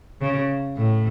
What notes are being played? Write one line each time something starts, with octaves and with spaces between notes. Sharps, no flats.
C#3
A2